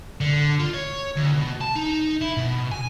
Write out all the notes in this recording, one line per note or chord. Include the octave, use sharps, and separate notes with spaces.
D3
F4
C#5
D2
B2
A5
D#4
E4
B2
G#5